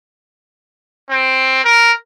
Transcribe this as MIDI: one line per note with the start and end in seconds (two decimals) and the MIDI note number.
1.10 1.64 60
1.64 1.92 70